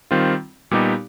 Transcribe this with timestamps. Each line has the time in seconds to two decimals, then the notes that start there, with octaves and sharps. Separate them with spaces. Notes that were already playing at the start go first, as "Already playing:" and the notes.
0.11 D#3 G3 C4 F4
0.71 A#2 G3 B3 D#4 G4